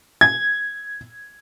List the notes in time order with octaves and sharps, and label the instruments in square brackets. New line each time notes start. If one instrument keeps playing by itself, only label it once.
[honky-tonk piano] G#6